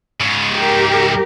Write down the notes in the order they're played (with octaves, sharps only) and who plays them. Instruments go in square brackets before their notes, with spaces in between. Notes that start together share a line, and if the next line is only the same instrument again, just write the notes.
[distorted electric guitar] G#2 C#3
[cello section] G4 A#4